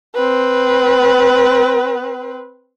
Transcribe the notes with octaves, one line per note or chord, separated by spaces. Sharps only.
C4 B4